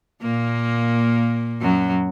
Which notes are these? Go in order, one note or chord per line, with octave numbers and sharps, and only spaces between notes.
A#2 A#3
F#2 F#3